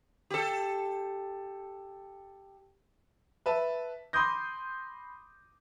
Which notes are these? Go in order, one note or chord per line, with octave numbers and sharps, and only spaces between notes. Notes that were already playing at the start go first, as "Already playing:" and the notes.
G4 A4
B4 E5 A5
B5 C6 D6 D#6 G6 A#6